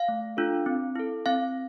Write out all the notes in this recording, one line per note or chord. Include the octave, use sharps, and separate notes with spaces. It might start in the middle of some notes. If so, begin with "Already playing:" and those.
Already playing: F5
A3
D4 F4 A4
C4
E4 A4
C4 F5